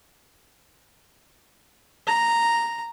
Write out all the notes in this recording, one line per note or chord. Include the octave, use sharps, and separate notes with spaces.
A#5